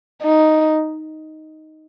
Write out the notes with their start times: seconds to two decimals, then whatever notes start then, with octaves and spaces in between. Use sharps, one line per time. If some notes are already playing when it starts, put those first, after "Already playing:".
0.23 D#4